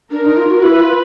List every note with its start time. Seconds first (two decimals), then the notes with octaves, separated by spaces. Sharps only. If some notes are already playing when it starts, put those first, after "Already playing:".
0.11 D4 A#4
0.25 D#4
0.37 F4
0.50 F#4
0.62 E4 B4
0.80 F4